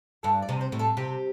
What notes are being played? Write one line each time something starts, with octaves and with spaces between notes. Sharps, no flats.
G2 A4
D5
C3
C5
A2
A4
C3 G4